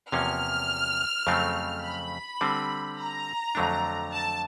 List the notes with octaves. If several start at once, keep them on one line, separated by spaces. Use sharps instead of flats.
E2 C3 F3 A#3 C#4 F6
F2 C#3 F#3 A3 C4
B5
D3 G3 C4
A#5
F2 D3 F#3 A3 D4
A5